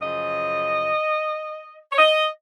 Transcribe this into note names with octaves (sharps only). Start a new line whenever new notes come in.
F#2 C#3 F3 D#5
C#5
D#5